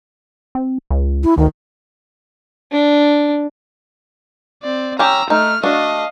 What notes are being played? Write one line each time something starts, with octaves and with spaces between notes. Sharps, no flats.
C4
C#2
E4
D2 D#3
D4
C4 D5
C#4 G4 A#5 E6
A3 D#4 F6
A3 D4 F#4 D#5 F5